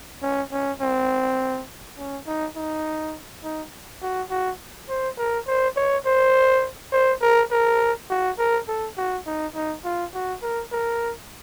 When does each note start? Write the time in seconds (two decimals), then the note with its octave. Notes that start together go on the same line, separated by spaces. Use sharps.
0.22 C#4
0.52 C#4
0.81 C4
1.98 C#4
2.27 D#4
2.56 D#4
3.44 D#4
4.02 F#4
4.30 F#4
4.89 C5
5.18 A#4
5.47 C5
5.77 C#5
6.06 C5
6.93 C5
7.22 A#4
7.51 A#4
8.10 F#4
8.39 A#4
8.68 A4
8.98 F#4
9.26 D#4
9.55 D#4
9.85 F4
10.14 F#4
10.43 A#4
10.72 A#4